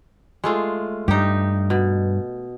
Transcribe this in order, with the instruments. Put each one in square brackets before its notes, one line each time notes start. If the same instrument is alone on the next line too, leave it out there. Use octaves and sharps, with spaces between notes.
[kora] G#3 A3 F4
[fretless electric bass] G2 [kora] D#4 G4
[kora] B2